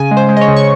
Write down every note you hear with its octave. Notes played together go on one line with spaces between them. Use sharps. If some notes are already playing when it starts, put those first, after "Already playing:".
Already playing: C#3 G#5
G#3
C5
G#3
D#5
C#5
C#3
C#6